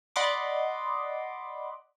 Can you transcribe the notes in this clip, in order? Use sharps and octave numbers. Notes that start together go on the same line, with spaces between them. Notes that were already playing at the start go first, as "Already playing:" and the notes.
D5 D#5 F#5 B5 C6 D6